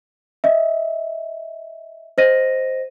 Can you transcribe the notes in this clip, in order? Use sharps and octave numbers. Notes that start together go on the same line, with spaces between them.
D#5 E5
C5 D#5 A#6 D#7